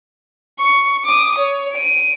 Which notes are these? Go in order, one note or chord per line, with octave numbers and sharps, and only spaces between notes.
C#6
D6 D#6
C#5
D7 D#7